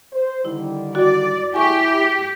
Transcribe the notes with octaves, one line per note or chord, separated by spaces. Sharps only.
C5
D3 D#3 G3 E4
F#4 D5
E4 G4 G#4 G#5 C#6